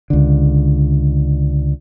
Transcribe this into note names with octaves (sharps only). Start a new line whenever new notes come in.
C#2 D3